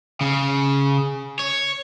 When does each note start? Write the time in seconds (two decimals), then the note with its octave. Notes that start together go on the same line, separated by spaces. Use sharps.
0.21 C#3
1.39 C#5